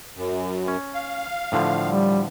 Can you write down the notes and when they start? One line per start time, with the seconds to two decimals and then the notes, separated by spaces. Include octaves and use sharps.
0.16 F#2
0.68 C#4
0.94 F5
1.52 A2 D3 F3
1.87 G3